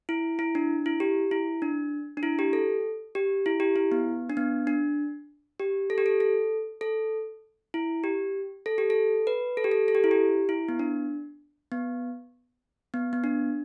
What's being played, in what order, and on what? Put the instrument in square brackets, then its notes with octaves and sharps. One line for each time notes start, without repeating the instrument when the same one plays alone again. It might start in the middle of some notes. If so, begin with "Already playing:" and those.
[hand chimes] E4
E4
D4
E4
G4
E4
D4
D4
E4
G4
A4
G4
E4
G4
E4
B3
D4
B3
D4
G4
A4
G4
A4
A4
A4
E4
G4
A4
G4
A4
B4
A4
G4
A4
A4
G4
E4
G4
E4
B3
D4
B3
B3
B3
D4